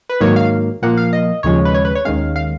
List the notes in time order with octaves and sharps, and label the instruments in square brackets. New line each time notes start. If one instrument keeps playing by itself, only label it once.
[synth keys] B4
G#2 D#3 F#3 A#3 C#5
F5
A#2 F3 A#3 F#5
F5
D#5
D#2 C#3 F3 G#3 C#4 C#5
B4
C#5
B4
C#5
D#2 D#3 G#3 C#4 F5
F5